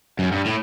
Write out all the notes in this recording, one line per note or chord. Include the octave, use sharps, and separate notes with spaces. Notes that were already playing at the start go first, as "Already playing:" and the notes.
F#2
G2
A2